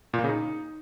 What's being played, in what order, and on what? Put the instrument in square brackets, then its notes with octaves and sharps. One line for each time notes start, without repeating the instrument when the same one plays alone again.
[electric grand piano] A#2
A#3
C#3
D#4